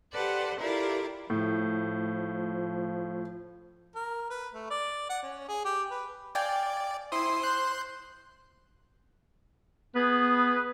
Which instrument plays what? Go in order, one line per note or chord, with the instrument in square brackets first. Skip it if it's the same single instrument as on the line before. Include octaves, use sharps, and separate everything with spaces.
[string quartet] G4 A4 B4 C5 D5 F#5
E4 F4 G4 A4 A#4 D5
[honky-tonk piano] A2 [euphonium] F3
[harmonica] A#4
B4
A3
D5
F#5
C#4
G#4
G4
B4
[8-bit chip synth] D5 [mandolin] F5 G5 G#5
[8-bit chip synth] E4 C6 D#6 [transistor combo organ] C5
[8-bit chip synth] C6 F#6 G6
[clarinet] B3 [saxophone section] G#4 B4